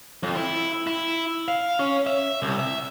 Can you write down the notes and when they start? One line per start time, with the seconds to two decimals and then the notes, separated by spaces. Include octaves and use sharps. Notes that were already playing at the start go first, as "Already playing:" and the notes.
0.23 F2
0.35 E4
0.87 E4
1.48 F5
1.79 C#4
2.07 E5
2.42 C2
2.59 E5